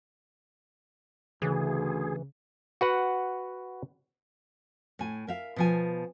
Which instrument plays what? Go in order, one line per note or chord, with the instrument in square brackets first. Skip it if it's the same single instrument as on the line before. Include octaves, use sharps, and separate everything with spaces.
[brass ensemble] D2 [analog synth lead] C#3 [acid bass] E3 [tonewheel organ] G#4
[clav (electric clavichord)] F#4 B4 F#5
[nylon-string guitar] A2 G#5
A#4 E5 F5
B2 F3 G#5